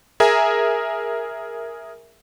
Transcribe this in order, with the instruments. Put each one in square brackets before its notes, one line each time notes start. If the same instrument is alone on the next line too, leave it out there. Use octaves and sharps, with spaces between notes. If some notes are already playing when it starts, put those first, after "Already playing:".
[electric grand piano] G#4 A#4 E5 G#5 A#5